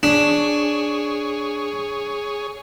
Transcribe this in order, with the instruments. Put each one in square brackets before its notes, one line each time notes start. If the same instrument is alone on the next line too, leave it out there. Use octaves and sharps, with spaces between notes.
[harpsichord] D4 [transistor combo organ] G#4 C#5